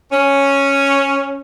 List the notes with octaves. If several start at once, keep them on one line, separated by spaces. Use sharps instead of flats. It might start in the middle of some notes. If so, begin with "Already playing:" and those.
C#4